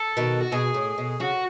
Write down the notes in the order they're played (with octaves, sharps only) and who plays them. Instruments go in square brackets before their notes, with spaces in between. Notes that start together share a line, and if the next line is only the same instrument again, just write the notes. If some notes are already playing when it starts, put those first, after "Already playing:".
Already playing: [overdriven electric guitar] A4
[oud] B2 D#3
[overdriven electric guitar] F#4
[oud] B2 [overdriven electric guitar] G#4
[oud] A2
B2
[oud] C#3 [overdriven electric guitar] F#4